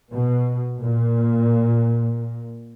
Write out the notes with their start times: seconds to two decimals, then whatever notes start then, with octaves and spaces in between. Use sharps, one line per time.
0.12 B2
0.80 A#2